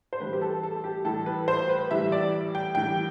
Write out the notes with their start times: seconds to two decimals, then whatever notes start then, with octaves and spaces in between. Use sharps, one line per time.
0.13 C5
0.20 A2 E3 G3 B4
0.33 G4
0.42 A4
0.63 A4
0.84 G4
1.05 A2 E3 G3 A4
1.26 B4
1.48 C5
1.69 B4
1.91 A2 E3 G3 E5
2.12 D5
2.55 G5
2.75 A2 E3 G3 G5